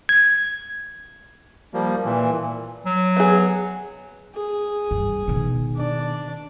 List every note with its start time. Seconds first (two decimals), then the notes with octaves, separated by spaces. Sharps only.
0.09 G#6
1.74 F3 G3 A#3
2.05 A#2 E3
2.86 F#3
3.17 B3 G#4
4.35 G#4
4.91 G2
5.28 B2 D#3
5.76 D4 D5